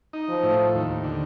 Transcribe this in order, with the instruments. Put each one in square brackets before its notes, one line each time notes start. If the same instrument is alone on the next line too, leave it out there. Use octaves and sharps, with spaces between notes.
[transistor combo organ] D#4
[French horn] F3
[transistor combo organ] A2
D#2
D3